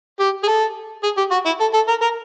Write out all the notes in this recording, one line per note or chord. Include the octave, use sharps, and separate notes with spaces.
G4
G#4
A4
G#4
G4
F#4
E4
A4
A4
A#4
A#4